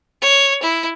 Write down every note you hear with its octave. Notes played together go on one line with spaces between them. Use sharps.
C#5
E4